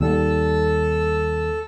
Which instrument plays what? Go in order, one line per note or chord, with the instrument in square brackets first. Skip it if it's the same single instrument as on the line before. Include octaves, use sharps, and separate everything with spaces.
[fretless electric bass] D#2 G3 [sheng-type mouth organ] A4 E6